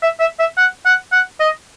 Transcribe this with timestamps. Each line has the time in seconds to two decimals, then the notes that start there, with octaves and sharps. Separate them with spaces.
0.03 E5
0.20 E5
0.39 E5
0.57 F#5
0.85 F#5
1.12 F#5
1.40 D#5